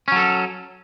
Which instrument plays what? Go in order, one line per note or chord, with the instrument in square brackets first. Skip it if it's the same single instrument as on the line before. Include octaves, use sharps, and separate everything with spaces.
[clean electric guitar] C#4
F#3
A4